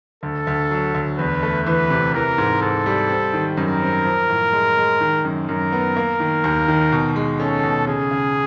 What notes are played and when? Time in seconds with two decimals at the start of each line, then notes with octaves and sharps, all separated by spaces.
0.23 D2 A4
0.47 D2
0.71 F#3
0.95 D2
1.19 E2 B4
1.43 A3
1.66 E3 B4
1.90 C3
2.14 E3 A#4
2.38 G#2
2.62 G#2 A4
2.86 G3
3.09 C4
3.34 D#3
3.57 F#2 A#4
3.81 C4
4.05 F3
4.29 A2
4.53 G#3
4.77 G#3
5.01 D#3
5.25 F#2
5.49 F#2 A#4
5.72 B3
5.97 A#3
6.20 D#3
6.44 D#2
6.68 D#3
6.92 B2
7.16 G#3
7.40 C#4 A4
7.64 B2
7.87 C#3 G#4
8.11 C#3